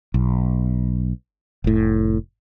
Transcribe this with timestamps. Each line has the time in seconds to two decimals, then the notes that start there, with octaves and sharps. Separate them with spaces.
0.14 B1
1.64 F1 A2